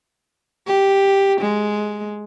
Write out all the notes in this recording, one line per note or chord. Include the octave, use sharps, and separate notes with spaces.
G4
G#3